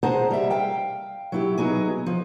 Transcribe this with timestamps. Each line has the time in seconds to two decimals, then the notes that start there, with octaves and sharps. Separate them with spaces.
0.03 G#4 C5 F#5 A5 A#5
0.30 G3 E5
0.50 F5 G5
1.32 F#3 E4 G4
1.58 F#3 B3 D#4 G#4
2.06 F3